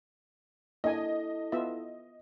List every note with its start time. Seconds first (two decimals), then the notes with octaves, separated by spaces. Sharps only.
0.84 A#3 D4 E4 A4 D#5 G#5
1.52 B3 F4 E5